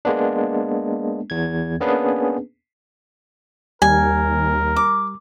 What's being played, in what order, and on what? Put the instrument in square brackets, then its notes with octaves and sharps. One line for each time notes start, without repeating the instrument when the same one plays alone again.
[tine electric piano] G#3 A#3 B3 D4
E2 G#6
A#3 B3 C#4 D4 G#4 B4
[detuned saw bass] D#2 [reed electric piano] G3 [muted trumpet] A#4 [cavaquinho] G#5
[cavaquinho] D6